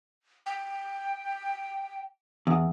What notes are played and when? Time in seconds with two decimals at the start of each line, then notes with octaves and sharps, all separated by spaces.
0.46 G5
2.47 E2